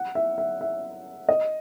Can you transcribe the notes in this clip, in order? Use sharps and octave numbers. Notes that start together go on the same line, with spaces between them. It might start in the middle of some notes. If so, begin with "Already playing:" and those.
Already playing: F#5
E5
E5
E5
D#5